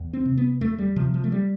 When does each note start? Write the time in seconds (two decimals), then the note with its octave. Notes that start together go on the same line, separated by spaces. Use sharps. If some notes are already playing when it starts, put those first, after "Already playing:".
Already playing: E2
0.13 C4
0.25 C3
0.38 B3
0.61 E2 A3
0.78 G3
0.96 C3 F3
1.14 F3
1.24 A3
1.32 G3